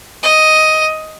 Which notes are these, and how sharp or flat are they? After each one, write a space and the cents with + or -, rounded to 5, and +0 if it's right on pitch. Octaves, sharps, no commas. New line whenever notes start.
D#5 +5